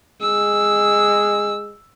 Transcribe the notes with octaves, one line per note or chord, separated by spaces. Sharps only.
G#3 E6